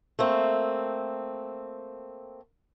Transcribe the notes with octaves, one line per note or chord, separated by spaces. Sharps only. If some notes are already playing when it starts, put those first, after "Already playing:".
A3 A#3 C4